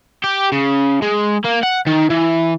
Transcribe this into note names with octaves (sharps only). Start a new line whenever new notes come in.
G4
C#3
G#3
A#3
F#5
D#3
E3